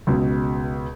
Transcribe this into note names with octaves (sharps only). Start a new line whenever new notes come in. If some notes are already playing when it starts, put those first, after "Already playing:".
C#2 B2